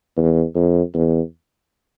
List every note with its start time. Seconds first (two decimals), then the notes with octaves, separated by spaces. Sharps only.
0.17 E2
0.55 F2
0.94 E2